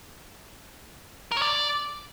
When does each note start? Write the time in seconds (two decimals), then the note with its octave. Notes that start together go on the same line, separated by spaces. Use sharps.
1.32 A#4
1.37 C#5
1.42 D5